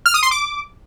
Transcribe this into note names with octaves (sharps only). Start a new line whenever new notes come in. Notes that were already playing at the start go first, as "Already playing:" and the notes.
F6
D#6
C6
D6